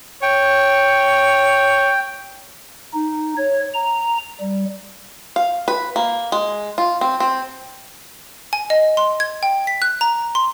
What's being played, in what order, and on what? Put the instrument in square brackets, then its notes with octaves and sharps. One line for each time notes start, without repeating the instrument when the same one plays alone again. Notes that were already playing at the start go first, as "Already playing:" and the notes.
[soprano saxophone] C#5 [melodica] G5
[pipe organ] D#4
C#5
A#5
G3
[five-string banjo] F5
B4
A#3
G#3
F4
C4
C4
[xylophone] G#5
D#5
C6
G#6
G5
B6
F#6
A#5
C6